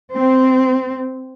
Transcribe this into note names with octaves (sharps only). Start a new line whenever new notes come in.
C4